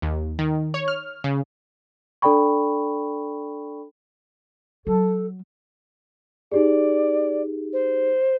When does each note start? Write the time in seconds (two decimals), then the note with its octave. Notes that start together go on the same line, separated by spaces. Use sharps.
0.02 D#2
0.39 D#3
0.74 C#5
0.88 F6
1.24 C#3
2.22 D4 A4 D5 G5 B5 C#6
4.87 F#3 A4
6.52 D#4 G4 G#4 D5
7.73 C5